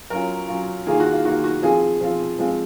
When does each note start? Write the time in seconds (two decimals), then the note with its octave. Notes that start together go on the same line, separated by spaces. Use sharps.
0.10 F#3 C#4 F4 A#4
0.48 F#3 C#4 F4
0.87 D#3 A#3 F4 G#4
1.00 F#4
1.12 F4
1.25 D#3 A#3 F4 F#4
1.44 F#4
1.62 F3 C4 F4 G#4
2.01 F3 C4 F4
2.38 F3 G#3 C4 F4